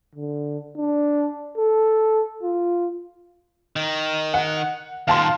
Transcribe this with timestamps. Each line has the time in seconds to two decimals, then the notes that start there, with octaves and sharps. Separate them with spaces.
0.15 D3
0.77 D4
1.57 A4
2.43 F4
3.76 D#3
4.34 F#5
5.08 D#2 A#2 F5 A5 C6